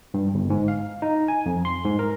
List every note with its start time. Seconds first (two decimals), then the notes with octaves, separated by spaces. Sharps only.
0.14 G2
0.34 G1
0.50 G#2
0.68 F5
1.02 D#4
1.28 G#5
1.46 F2
1.65 C6
1.85 G#2
1.99 A#4